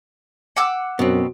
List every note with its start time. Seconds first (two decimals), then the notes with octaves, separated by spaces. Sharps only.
0.56 F#5 D6 E6
0.99 F#2 B2 C4